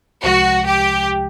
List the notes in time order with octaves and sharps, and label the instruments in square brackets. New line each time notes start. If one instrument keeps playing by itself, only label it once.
[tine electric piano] C2 C3 F3 G#3 [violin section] F#4
[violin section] G4